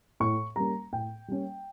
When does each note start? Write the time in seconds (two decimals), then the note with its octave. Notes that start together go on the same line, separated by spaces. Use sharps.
0.20 A2 C#6
0.56 G3 A#3 C#4 A#5
0.93 A2 G5
1.28 G3 A#3 C#4